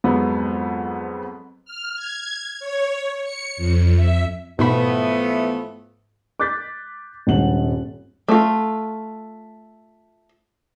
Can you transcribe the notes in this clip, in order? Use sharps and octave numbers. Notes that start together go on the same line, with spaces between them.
F2 G#2 F#3 B3
F6
G#6
C#5
C#7
F2
E5
G#2 B2 E3 F3 A3 B3 B5
D6 F#6 G6 A6 B6
D#1 G#1 G2 F#5 F#7
A3 F4